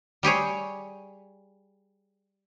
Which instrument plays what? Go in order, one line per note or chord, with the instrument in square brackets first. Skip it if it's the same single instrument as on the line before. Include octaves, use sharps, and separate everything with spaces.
[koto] G3 G4 G#4 C#5